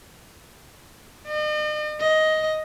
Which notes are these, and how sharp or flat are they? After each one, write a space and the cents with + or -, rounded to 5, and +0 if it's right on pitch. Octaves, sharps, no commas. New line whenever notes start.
D#5 -45
D#5 +10